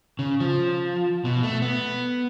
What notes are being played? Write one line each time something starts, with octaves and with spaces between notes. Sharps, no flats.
C#3
F3
B2
A3
B3